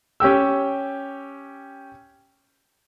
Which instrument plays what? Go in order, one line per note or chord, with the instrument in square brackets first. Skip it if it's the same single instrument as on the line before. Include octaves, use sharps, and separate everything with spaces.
[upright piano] C#4 G4 G5 E6